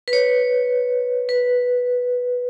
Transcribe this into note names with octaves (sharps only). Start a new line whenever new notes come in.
B4
C#5
B4